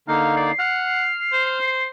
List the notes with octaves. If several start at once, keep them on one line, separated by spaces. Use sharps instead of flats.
D3 A#3 D#4 F5
D5 C7
F#5 F6
C5